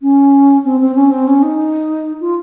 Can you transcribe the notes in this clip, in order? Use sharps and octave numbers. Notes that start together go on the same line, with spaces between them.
C#4
C4
C4
C#4
C4
C#4
D#4
F4